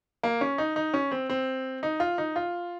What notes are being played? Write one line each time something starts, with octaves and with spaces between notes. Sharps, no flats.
A#3
C#4
D#4
D#4
C#4
C4
C4
D#4
F4
D#4
F4